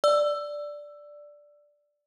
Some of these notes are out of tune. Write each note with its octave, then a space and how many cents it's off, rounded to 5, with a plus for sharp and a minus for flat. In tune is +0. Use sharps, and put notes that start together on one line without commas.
D5 +0 E6 +15